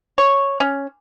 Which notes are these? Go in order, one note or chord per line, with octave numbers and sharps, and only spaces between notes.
C#5
C#4